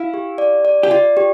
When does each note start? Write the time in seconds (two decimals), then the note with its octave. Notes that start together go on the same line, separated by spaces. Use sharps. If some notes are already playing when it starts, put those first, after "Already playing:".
Already playing: E4 F5
0.14 G4
0.38 D5
0.65 D5
0.83 G4
0.91 F4 D5
1.17 G4